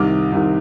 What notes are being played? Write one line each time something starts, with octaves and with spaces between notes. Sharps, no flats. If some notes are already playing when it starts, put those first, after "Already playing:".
Already playing: C2 C3 D#3 D6 F6
C2 C3 D#3